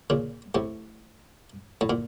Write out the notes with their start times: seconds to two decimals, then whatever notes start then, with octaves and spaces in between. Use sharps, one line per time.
0.10 A#2 C#3
0.55 A2 C3
1.81 A2
1.90 A#2